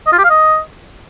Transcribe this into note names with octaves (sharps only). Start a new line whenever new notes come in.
D#5
F4
G4
F5
D#5